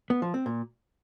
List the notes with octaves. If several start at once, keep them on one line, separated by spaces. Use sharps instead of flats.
B3
F3
C4
A#2